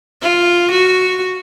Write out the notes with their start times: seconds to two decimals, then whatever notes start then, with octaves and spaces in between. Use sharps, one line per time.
0.22 F4
0.71 F#4